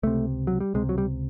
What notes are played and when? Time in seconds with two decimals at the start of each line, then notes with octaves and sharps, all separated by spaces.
0.03 C#2 C3 A3
0.47 F#3
0.60 G3
0.74 C#2 C3 G#3
0.89 F#3
0.98 G3